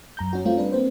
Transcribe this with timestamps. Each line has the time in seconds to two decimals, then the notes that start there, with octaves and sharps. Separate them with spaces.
0.17 F#2 A#5 G6
0.33 C#4 F#4
0.45 G3 A3 C4 F4
0.58 D4 B4
0.72 A#3 C4 C5